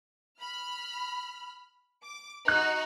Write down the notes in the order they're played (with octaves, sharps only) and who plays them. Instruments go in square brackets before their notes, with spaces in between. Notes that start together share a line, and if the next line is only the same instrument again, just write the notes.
[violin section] B5 F6
D6
[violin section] D#4 F#4 [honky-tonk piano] F#6